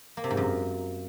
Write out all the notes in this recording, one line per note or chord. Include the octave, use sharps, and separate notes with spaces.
A#3
C3
G#2
F#2